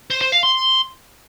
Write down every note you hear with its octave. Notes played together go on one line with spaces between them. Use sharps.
C5
C5
F5
C6